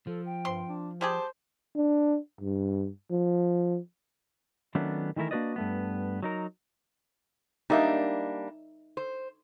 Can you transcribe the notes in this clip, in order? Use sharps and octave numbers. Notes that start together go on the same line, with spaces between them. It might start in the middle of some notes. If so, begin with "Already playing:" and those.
F3 A4
G5
G2 C4 C5 C6
D4
G3 G4 G#4 C5 A5
D4
G2
F3
D#3 F#3 A3 B3 C#4 D4
D#3 E3 A3 E4 A#4
A#3 D4 F#4 B4 D5 D#5
G2 A3 B3
F#3 D#4 A#4
G3 A#3 D4 D#4 D5 E5
C5